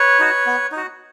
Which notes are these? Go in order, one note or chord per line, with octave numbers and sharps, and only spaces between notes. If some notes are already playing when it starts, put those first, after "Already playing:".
Already playing: B4 C#5
D#4 F#4
B3
D#4 F#4